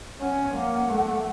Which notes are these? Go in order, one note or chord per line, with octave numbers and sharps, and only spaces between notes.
C#4 F#5
A#3
A3